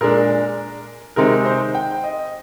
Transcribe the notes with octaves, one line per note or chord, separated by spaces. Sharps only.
A#2 G#3 D4 A#4
C3 D#3 G#3 C4 D#4 A#4
C5
G5
D#5